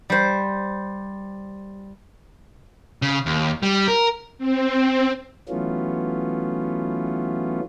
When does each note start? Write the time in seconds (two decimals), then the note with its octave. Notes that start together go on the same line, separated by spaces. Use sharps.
0.10 G3 C5
3.02 C#3
3.26 D#2
3.63 G3
3.88 A#4
4.38 C4
5.49 E3 F#3 A3 B3 C#4 F4